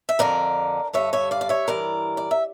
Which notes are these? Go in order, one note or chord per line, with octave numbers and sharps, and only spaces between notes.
E5
F2 D3 A#4 D5
G2 D3 C#5 E5
C#5 E5
D5 F5
D5
C#5 E5
G2 E3 A#4 D5
D5
E5